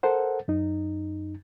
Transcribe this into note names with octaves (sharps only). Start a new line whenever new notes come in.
A4 A#4 C5 F#5
F#2 D#4